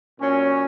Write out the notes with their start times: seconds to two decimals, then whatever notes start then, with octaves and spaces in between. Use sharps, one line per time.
0.19 A#2 F#3 C#4